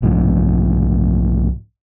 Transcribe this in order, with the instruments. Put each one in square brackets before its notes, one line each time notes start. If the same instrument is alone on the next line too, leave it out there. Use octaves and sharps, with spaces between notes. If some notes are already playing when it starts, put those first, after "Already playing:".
[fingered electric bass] B1 G#2 F3 D4